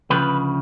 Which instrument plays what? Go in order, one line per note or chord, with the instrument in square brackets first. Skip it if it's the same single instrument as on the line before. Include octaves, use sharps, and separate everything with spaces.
[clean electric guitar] D2 C#3 F3 B4